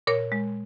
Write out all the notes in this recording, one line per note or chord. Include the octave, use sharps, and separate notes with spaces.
A#2 A#4 C#5
G#3